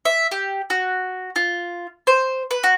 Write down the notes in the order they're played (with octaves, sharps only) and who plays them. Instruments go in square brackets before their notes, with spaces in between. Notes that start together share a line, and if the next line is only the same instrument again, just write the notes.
[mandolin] E5
G4
F#4
F4
C5
B4
F#4